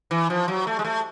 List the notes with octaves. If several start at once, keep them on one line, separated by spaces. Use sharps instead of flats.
E3
F3
F#3
A3
G#3
A3